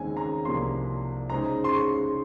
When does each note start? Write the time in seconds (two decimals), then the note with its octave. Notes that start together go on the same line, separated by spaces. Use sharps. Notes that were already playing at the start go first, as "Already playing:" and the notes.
Already playing: D#2 C#3 G#3 C4 D#4 G#5
0.17 A#5
0.45 C2 C3 F3 A#3 C6
1.29 C#3 G#3 D#4 G#4 C5 A#5
1.64 C6
1.72 C#6